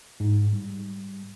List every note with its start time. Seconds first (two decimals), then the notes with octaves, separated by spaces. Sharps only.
0.20 G#2
0.53 G3